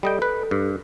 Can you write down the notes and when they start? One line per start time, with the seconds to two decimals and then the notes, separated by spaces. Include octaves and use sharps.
0.03 G3 A4 D#5 G5
0.22 B4
0.51 G2